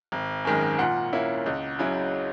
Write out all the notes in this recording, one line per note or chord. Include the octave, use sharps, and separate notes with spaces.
G#1
F#2 D#3 G#3
A#2 F#5
A#3 C#4 E4
C#2
C#3 F#3 C#4 E4